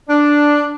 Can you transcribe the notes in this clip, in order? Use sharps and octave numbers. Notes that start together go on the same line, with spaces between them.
D4